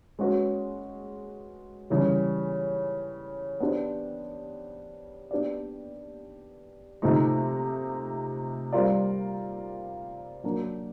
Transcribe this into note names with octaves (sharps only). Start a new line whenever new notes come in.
G#3 C#4 F#4 B4
C#3 E3 G3
B3 D4 G4 C5
B3 D4 G4 B4 D5
C3 F3 A3 C4 D#4
G3 C4 F4 A#4 D5
F#3 A#3 D4 F#4 A#4